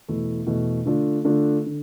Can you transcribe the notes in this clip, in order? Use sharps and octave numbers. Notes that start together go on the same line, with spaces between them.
E2 B2 A3 E4
E2 B2 A3 E4
D3 A3 D4 F4
D3 A3 D4 F4
D3